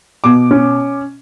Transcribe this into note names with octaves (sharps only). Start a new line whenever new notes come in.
B2 D6
C#4